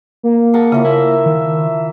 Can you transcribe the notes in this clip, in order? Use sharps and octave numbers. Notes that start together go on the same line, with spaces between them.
A#3
G#4 A#4 F#5 A5
C#3 E3 F3
E4 D#5 E5
D#3